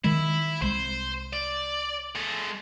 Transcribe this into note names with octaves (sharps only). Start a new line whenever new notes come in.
D#3 G#3 E4
C2 G#3 C5
D5
G#3 A4